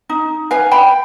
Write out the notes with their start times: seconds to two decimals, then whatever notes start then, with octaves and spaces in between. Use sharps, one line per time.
0.09 D#4
0.51 B4 F5 G#5
0.71 G5 B5